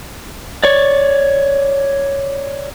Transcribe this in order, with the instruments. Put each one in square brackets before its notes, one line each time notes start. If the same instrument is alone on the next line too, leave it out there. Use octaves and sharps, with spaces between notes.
[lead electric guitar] C#5 D5